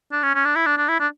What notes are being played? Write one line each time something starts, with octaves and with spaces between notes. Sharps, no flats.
D4
C#4
C#4
D4
E4
D4
D4
E4
D4